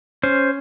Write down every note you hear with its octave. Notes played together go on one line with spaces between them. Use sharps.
C#4 C5